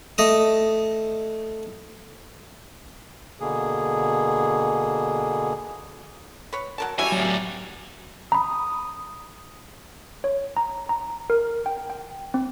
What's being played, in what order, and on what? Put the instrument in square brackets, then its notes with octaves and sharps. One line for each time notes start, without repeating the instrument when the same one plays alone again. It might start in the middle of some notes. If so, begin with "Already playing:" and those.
[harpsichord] A3 D#5 D#6
[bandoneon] B2 D3 A#3 G#4
[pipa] B4 C#5
F#3 A#4 A5
[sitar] G3 C#4 F#4 [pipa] E4 E5 [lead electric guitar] G#5
[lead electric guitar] A2 F#3
[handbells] A#5 B5 [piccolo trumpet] D#6
[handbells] C#5
A#5
A#5
A#4
G5
G5
C4